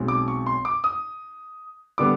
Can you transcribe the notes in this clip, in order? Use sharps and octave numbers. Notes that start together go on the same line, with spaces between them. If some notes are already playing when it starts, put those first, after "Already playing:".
Already playing: B1 B2 G#3 C4
D6
C#6
C6
D6
D#6
D3 G3 B3 D6